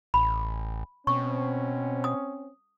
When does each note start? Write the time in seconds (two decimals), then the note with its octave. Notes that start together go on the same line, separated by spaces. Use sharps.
0.14 A1 B5
1.07 B2 C4 C#4 C#6
2.04 D#6